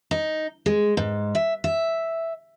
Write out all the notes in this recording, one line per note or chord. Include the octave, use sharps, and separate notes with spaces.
D#4
G#3
G#2
E5
E5